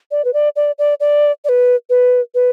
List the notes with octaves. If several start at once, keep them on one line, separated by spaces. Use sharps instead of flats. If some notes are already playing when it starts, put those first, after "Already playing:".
D5
B4
D5
D5
D5
D5
D5
B4
B4
B4